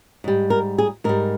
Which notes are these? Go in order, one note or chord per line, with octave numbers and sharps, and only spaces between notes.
G#2 G3
A#4
G#4
G#2 G3 A#4